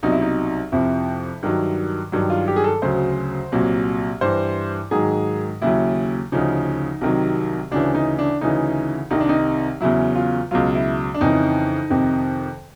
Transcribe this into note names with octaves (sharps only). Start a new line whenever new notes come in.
C2 B2 F#3 D#4
E4
D#4
F2 C3 F3 E4
G2 D#3 F#3
G2 D#3 F#3
F4
G4
G#4
A4
D2 C#3 F#3 C5
C2 A#2 F#3
G2 E3 C5
G#2 D#3 F#3 G#4
D#2 C#3 F#3 E4
D2 C#3 F3 D#4
C2 C3 D#3 F#3
D2 C#3 E3 D4
D#4
D4
D2 C#3 E3 D#4
C2 C3 D#3 D#4
D4
D#4
E2 C#3 F#3 E4
F4
C#2 B2 F#3 F4
E4
D4
F2 C#3 E3 D#4
F2 C3 D#3